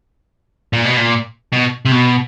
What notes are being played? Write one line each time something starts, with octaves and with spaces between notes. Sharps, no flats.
A#2
B2
A#2
B2
C3
B2